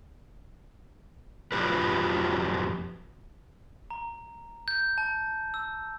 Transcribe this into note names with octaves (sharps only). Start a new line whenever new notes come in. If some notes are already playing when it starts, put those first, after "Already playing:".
F2 F3 F#3 B3 G4 B4
A#5
G6
A5
E6